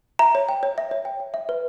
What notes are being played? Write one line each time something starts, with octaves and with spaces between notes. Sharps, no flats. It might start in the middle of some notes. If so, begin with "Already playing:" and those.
E5 A#5
C#5
G5
C#5
E5
C#5
G5
C#5
E5
B4